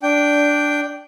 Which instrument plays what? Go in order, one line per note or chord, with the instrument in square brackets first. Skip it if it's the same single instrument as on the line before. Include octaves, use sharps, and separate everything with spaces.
[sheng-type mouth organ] D4 G5